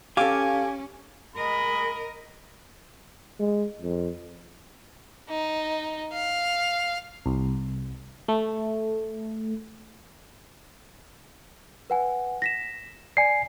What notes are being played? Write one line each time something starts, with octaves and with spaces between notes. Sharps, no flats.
C#4 G4 A4 F5 G#5 D6
G#3 A#4 D#5 B5
G#3
F2
D#4
F5
C2
A3
B4 F#5 G#5
A#6 B6 E7
D5 G#5 C7 C#7